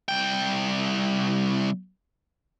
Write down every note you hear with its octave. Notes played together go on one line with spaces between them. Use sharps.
C2 G5